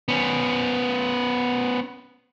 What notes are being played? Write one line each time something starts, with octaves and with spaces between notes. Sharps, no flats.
B3 C#4